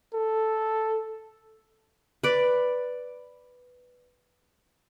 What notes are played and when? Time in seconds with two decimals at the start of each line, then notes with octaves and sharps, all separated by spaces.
0.14 A4
2.24 B4 D5